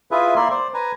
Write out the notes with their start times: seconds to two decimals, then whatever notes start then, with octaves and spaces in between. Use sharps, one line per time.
0.11 E4 F4 G#4 B4 E5
0.36 A#3 E4 A#4 D5 E5 C6
0.51 C5 D5
0.74 B4 G#5 A#5